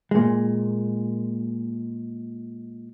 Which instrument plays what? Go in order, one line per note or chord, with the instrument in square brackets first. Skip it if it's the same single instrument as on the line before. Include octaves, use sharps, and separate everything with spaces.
[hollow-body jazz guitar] A#2 G#3